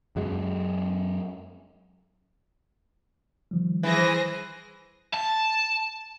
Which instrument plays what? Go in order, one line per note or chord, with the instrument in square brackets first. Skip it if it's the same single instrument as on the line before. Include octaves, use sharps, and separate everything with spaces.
[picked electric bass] F#2 F#3 G#3
[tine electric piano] D#3 F3 G3
[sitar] E3 [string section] G#4 C5 A#6
[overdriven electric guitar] A5